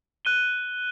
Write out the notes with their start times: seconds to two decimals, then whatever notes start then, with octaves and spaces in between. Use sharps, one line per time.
0.25 F#6 D#7 G7